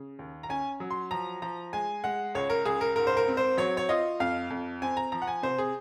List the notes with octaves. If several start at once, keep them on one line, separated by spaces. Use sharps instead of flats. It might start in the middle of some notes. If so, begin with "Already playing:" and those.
Already playing: C#3
D#2
A#5
C#4 G#5
F#3
C6
F3 A#5
F3 A#5
G#3 G#5
G#3 F#5
C#2 C#5
A#4
C#2 G#4
A#4
G#2 A#4
C5
A#4
C4
C5
F#3 C#5
C#5
F4 D#5
F2 F5
F2
C4 G#5
A#5
F3 A#5
F#5
G#5
C3 C5
G#4